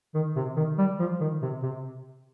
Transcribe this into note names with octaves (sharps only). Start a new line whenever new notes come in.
D#3
C3
D#3
G3
F3
D#3
C3
C3